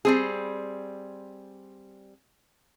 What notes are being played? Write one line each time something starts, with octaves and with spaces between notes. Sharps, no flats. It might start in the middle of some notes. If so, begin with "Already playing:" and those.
G3 C4 G#4